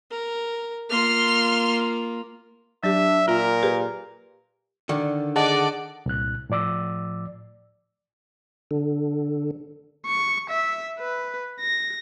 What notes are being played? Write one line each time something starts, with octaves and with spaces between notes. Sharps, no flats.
A#4
A#3 F4 C6 F6
F#3 D4 G4 E5
A#2 F4 A#4
G4 G#4 B4
D3 D#3 D5
G#4 D5 D#5 F#5 A5 D6
C2 A#2 F#6
A2 F3 D5 D6 E6
D3
C#6
E5
B4
A#6